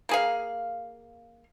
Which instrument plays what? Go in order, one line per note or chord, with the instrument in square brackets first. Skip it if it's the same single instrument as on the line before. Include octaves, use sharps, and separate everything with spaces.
[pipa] A#3 G#4 F5